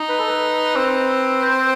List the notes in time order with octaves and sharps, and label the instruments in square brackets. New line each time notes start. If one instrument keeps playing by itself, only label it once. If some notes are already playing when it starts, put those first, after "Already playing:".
Already playing: [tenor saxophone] D#4
[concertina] B4
A4
B4
[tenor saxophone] C4
[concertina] C5